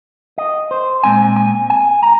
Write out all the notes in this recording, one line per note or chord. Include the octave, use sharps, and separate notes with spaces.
D#5
C5
A#2 G#3 C4 G#5
G#5
G#5
A#5